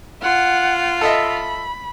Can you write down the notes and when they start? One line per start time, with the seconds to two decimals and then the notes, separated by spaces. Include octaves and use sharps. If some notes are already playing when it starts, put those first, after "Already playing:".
0.23 F4 F#5
1.01 A4 D#5 E5 B5